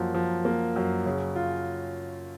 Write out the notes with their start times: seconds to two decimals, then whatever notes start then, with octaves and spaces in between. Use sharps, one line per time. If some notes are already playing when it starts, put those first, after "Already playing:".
Already playing: F#2 F3 A#3
0.15 F3
0.45 A#3
0.76 F#2
1.06 C#3
1.36 F4